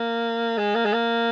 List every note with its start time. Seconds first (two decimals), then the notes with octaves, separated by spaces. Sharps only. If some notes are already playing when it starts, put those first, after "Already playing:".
Already playing: A#3
0.58 G#3
0.75 A#3
0.85 G#3
0.93 A#3